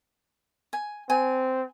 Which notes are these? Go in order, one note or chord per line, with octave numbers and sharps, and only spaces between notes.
G#5
C4 G#5